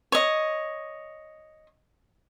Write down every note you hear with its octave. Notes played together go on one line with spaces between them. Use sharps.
C#5 D#5